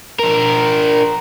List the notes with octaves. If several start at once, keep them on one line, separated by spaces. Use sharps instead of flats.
D4 A#4